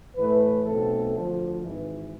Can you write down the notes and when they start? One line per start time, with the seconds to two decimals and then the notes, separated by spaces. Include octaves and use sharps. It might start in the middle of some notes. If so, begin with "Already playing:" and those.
0.16 A2 E3 A3 B4
0.66 B1 B2 A3 C4 A4
1.16 D2 D3 F3
1.64 G#1 G#2 E3